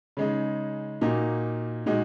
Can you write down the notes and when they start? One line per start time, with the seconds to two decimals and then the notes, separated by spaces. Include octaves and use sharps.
0.17 C#3 G#3 D#4
1.01 A#2 A#3 D#4 F#4
1.86 A#2 G#3 D#4 F#4